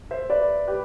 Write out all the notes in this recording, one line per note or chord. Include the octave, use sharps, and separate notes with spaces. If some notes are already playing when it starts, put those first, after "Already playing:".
C5 E5
B4 D5
G4 B4